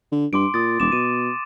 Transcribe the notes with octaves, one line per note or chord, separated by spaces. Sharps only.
D3
G2 C6 D6 D7
A#2 C6 D#6 A6
E1 D6 E7
B2 D#7